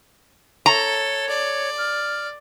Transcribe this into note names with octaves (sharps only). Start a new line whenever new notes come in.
A4 C#5 A#5
D5
F6